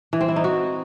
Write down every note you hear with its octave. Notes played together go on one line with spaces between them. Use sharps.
E3
C4
E4
D#4
F#4